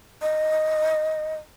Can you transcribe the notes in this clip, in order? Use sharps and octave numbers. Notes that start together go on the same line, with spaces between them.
D#5